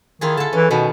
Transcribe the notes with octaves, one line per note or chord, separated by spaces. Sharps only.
D#3 E4 F4 G#4
D3 A4 A5
E3 C#4
B2 D#3 B3